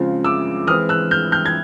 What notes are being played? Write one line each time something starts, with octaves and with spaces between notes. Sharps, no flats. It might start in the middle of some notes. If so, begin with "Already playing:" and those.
Already playing: C#3 F3 G#3 C4 F4
D6 E6
E3 G#3 C4 D#6 F6
E6 F#6
F6 G6
F6 G6
G#6